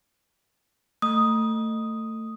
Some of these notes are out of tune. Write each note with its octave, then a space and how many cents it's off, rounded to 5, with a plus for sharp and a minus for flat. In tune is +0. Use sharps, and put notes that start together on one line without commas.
A3 +25 D#6 +0